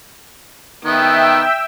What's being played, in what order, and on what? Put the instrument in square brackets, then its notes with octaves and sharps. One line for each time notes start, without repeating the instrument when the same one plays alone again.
[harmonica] D#3 B3 [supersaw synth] E5 G5 E6